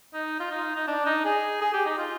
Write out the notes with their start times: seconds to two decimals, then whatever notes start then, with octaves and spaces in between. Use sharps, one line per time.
0.14 D#4
0.40 F4
0.51 D#4
0.76 D#4
0.87 D4
1.06 D#4
1.25 G#4
1.61 G#4
1.73 G4
1.85 D#4
1.97 F4